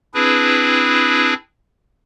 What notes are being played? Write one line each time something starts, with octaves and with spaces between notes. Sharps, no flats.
C4 D4 E4 G#4 B4